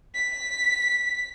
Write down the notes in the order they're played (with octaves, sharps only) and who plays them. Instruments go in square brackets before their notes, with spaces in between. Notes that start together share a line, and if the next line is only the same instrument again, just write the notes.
[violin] B6